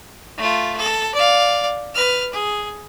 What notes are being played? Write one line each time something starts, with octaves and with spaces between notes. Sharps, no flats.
A3 F4
A4
D5 F5
B4 F6
G#4